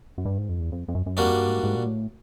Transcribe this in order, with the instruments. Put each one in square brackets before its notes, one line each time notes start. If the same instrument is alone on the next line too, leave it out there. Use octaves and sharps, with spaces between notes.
[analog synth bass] F#2
G2
G#2
F2
E2
F2
F2
F#2
F#2
[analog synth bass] F2 [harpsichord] G3 A#3 D4 F#4
[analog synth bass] G2
G#2
G#2
A#2
A2